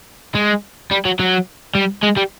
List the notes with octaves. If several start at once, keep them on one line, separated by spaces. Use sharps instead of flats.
G#3
G3
F#3
F#3
G3
G#3
G3